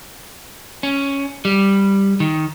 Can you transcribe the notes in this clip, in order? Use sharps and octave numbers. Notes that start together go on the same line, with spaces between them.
C#4
G3
D#3